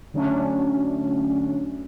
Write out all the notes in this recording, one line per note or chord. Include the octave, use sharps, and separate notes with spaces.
D3 F#3 A3 C#4 D4